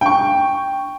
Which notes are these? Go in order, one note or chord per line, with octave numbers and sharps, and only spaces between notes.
G5 C#6